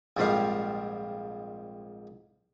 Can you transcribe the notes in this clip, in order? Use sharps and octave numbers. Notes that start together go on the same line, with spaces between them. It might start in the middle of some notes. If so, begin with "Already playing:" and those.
A#1 F2 G#2 F3 G3 F5